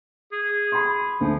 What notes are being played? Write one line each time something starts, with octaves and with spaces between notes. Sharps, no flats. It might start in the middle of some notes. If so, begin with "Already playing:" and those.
G#4
B5 C6
D2 F3